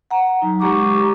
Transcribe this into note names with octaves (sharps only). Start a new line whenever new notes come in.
F#5 A#5
F#3 D#4
G#3 G4 A#5 C#6 D6